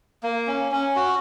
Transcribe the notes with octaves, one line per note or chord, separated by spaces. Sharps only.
A#3
C#4
C#4
F#4